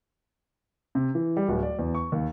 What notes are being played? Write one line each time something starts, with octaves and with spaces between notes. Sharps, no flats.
C3
E3
G3
D1
D5
E2
C#6
D#2